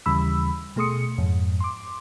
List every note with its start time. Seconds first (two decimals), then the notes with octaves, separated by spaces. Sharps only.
0.06 D#2 C#3 E3 G3 B5 E6
0.76 B2 A3 G#4 C6 D#6 C#7
1.18 F2 G#2
1.60 C6 D6